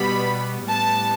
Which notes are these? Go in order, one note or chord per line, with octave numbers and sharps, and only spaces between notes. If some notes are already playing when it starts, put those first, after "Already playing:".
Already playing: B2 G3 B3 B5
A2 G3 B3 A5